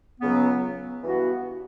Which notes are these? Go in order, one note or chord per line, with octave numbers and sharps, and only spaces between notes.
C#2 C#3 F#3 B3
G2 E3 B3 F#4